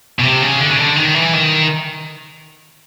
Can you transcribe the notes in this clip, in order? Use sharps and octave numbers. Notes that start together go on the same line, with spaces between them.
B2
C3
C#3
D3
C#3
D3
D#3
E3
D#3